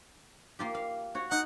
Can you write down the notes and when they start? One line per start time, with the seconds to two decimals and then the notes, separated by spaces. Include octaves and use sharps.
0.59 A#3 F4 G4
0.74 F5
1.15 F#4 C#5
1.31 D#4 F#5